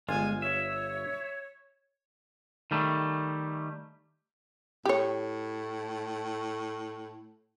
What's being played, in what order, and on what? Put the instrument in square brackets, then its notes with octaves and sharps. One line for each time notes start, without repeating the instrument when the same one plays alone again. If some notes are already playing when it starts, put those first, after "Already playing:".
[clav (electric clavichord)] G1 F4 [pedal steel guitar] G#3 [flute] G#5
[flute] C#5 [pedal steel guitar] E5
[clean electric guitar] D#3 G3 A3
[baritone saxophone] A2 [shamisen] G4 C#5